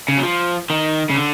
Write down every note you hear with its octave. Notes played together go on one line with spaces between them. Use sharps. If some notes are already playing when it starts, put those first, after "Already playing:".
C#3
F#3
F3
D#3
C#3
D3